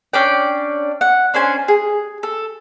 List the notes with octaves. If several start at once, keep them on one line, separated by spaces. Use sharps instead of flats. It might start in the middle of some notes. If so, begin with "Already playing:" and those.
C#4 D4 D5 G5
F#5
C#4 D4 C5 G#5
G#4
A4